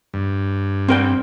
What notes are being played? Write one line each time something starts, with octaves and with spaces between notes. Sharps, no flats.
G2
C4 A#4 G5